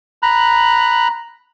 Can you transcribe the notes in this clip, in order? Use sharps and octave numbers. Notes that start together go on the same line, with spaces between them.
A#5 B5 F#6